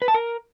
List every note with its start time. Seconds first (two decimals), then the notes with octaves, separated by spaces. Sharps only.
0.02 B4
0.08 A5
0.14 A#4